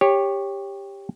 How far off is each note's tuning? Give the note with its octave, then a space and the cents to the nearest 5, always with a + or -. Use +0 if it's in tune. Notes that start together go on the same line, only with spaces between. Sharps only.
G4 +15 C#5 -10